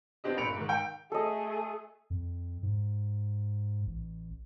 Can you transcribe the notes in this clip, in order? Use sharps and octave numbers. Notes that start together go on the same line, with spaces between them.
B3 C4 D4 G4 D#5
G1 A#2 B5 C#7 D7 F7
G#2 D#3
G5
A3 G#4 A4 D#5
F2
G#2
A1